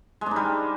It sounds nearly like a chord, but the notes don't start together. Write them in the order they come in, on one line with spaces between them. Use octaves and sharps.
G#3 D4 D#4 G3